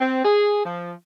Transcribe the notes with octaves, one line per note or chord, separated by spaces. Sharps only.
C4
G#4
F3